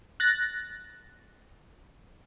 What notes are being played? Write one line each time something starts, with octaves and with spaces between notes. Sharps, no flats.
F#6 A6 A#6